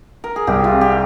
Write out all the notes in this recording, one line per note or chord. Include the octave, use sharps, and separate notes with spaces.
A#4
G#4
C2 G4
F4
C3
G4